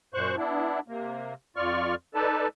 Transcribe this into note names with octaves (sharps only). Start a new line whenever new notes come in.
F#2 A#2 C5 C#6 F#6
B3 D4 E4
C3 A#3
F2 F4 D5 C#6 F6
D#4 A4 B4 D5 A5